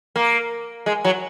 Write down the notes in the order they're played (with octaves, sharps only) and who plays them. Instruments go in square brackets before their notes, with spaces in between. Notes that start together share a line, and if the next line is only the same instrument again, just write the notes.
[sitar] A#3
G#3
F#3